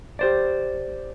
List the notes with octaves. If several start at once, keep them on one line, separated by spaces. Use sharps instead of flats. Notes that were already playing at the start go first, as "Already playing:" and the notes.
G4 C5 D5